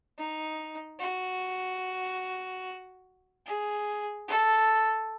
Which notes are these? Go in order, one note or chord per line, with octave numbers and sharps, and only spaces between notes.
D#4
F#4
G#4
A4